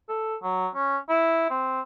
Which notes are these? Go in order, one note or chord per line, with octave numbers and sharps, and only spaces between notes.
A4
F#3
C#4
E4
C4